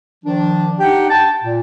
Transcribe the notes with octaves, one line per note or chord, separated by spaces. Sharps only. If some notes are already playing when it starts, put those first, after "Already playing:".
D#3 F3 D4
D4 D#4 G4 F#5 G5
G5 A5
A#2